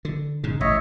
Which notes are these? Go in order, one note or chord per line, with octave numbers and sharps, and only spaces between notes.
D3
G#2 C#3
A1 C#5 D#5 E5